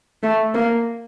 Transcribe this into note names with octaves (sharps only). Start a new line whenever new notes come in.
A3
A#3